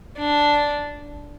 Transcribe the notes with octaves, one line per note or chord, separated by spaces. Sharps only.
D4